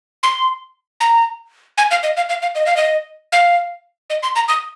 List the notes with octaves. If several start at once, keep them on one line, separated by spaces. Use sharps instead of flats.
C6
A#5
G#5
F5
D#5
F5
F5
F5
D#5
F5
D#5
F5
D#5
C6
A#5
D#6